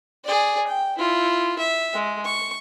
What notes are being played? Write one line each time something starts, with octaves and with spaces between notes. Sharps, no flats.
G#4 D5
G5
E4 F4
E5
G#3
C#6